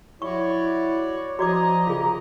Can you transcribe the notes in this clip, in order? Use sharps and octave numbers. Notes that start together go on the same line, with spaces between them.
E4 F#4 C#5 D5 C#6
F3 F#4 D5 D#5 A#5 D6
C#3 F4 G#4